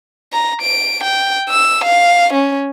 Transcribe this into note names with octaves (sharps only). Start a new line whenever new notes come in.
A#5
D7
G5
E6
F5
C#4